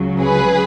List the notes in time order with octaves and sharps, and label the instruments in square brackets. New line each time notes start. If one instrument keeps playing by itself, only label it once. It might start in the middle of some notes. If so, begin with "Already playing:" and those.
Already playing: [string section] C#2 C#3 F#3
G#4 B4